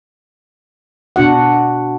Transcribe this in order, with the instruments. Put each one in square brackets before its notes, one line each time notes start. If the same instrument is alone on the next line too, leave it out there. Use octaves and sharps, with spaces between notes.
[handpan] B2 D4 F#4 F#5